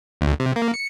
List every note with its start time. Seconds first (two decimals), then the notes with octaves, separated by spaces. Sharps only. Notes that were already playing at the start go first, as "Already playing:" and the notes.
0.21 D2
0.40 C3
0.56 A#3
0.74 C#7